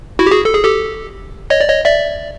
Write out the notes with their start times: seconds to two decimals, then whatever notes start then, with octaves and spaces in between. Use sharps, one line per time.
0.19 E4 F#4
0.27 G4
0.31 F#4 G#4
0.45 A4
0.54 G#4
0.64 G4 A4
1.50 C#5 D#5
1.61 D5
1.68 C#5 D#5
1.85 D5 E5